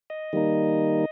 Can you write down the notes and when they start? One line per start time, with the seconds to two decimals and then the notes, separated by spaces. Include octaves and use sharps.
0.10 D#5
0.33 D#3 G3 A#3 D#4